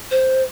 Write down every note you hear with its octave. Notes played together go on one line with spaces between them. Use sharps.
C5